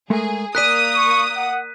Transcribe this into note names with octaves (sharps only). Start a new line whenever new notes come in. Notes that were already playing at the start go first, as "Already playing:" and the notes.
G#3 A3 G#4 A#4
A#3 A#4 D5 D#6 F#6 B6 D#7
C#6
F#5